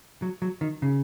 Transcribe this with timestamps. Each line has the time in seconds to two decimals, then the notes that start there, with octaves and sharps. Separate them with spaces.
0.22 F#3
0.42 F#3
0.61 D#3
0.82 C#3